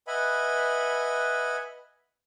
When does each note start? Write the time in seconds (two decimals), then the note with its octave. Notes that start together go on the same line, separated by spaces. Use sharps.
0.07 B4 D#5 E5 F#5 G#5 B5